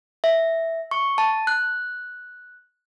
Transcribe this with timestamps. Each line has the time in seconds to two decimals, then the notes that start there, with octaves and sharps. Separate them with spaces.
0.24 E5
0.91 C#6
1.18 A5
1.47 F#6